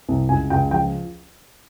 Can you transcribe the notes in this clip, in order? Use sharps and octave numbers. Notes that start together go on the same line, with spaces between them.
C2
C#2 G#5
C#2 G5
F3 G5